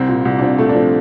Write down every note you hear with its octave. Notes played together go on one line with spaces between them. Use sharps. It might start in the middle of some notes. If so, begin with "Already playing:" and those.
Already playing: C2 C4
A#2
C2
D4
A#2 C4
A#2 A3
D4
F3 C4